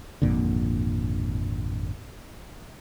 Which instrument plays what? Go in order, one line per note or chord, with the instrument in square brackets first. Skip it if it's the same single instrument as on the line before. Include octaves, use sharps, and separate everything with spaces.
[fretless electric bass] G#1 F2 A#2 D3